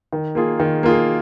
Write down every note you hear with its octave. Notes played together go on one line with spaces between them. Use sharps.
D#3
A#3 F4 G#4
D#3
A#3 F4 G#4